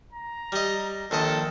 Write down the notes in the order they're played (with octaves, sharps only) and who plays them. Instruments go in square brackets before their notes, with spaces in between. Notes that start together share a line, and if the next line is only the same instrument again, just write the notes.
[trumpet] A#5
[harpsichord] G3 D#5
[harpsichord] A#1 D#3 D#5 [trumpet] A4